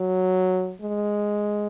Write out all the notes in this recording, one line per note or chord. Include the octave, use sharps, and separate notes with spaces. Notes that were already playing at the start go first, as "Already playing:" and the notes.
Already playing: F#3
G#3